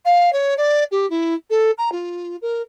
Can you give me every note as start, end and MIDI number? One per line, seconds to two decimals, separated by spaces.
0.05 0.32 77
0.33 0.54 73
0.57 0.84 74
0.91 1.08 67
1.10 1.34 64
1.50 1.71 69
1.78 1.92 82
1.92 2.36 65
2.42 2.62 70